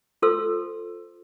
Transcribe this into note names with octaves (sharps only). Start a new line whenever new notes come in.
F4 A4 C5 C6 E6